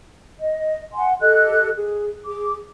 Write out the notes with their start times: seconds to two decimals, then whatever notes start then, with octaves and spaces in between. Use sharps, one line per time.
0.39 D#5
0.93 F#5 G#5 C6
1.20 G4 A4 D#5 F#6
1.77 G#4
2.26 G#4 D6